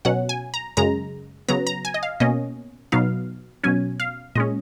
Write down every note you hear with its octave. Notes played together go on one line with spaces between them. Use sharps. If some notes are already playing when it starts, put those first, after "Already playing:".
B2 F#3 C#4 F#5
G#5
A#5
F#2 C#3 G#3 A#5
C#3 F#3 B3 A#5
A#5
G#5
D#5
F5
B2 A#3 C#4 D#5
B2 F#3 B3 D#4 F5
B2 F#3 C#4 G#5
F5
A#2 G#3 C#4 D#5